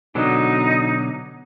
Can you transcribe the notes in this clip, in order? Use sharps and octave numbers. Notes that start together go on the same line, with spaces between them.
B2 D3 F#3 D#4